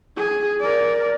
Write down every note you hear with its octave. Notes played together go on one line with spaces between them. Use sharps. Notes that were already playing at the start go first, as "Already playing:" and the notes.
G#4
A#4 D5